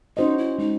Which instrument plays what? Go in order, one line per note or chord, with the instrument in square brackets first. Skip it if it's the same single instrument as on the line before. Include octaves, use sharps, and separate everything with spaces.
[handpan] C#4 F#4 C5 D#5 [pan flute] D#4
[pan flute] E4
[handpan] G#3 [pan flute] D#4